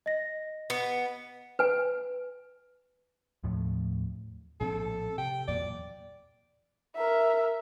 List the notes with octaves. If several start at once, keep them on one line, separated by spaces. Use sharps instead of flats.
D#5 A#6
B3
B4 G#5
D#2 A2 F3 A3
A#1 A2 C4 A4
C3 G5
E2 A#2 F#3 D5
A#4 E5